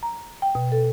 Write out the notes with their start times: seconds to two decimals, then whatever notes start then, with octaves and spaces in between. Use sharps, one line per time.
0.03 A#5
0.42 G5
0.55 B2
0.72 A4